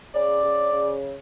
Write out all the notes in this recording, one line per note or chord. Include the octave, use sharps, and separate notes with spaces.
C#3 D5
C#3
C#3